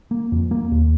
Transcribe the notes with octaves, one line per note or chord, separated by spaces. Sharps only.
A#3
F2
A#3
D#2